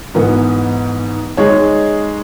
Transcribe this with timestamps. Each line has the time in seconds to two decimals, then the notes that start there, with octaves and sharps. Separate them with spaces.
0.14 G#2 E3 B3
1.37 G#3 D#4 G#4 C#5